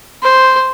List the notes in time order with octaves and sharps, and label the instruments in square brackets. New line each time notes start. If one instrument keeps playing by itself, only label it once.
[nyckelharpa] C5